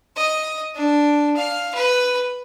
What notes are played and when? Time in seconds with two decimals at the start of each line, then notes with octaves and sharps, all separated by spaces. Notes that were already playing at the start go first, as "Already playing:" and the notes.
0.16 D#5
0.75 D4
1.36 F5
1.74 B4